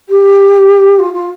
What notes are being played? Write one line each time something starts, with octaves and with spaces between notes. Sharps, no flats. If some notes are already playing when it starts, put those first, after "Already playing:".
G4
F4
F4